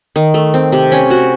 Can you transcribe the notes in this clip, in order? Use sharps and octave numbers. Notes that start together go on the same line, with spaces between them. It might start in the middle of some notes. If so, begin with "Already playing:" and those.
D#3
A3
C4
C3
C#4
F#4